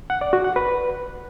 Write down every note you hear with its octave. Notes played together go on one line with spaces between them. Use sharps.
F#5
D5
F#4
F#5
B4